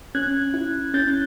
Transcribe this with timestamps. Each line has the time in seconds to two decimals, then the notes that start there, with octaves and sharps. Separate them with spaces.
0.15 C#4 F#6 G#6
0.54 E4
0.94 C#4 G6 A6